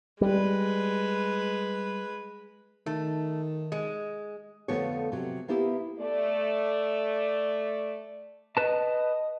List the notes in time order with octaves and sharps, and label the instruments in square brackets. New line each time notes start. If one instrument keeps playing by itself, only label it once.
[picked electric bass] G3 [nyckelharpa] G#3 B4
[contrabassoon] D#3 [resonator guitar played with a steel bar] A3
[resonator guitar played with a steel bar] G#3
[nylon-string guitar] F2 D3 F3 A3 B3 C#5
C3 F#3
A#3 B3 E4 G4
[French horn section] A3 D5
[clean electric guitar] B4 A5 [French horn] D#5